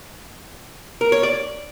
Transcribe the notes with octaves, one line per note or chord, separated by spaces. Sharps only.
A#4
C#5
D5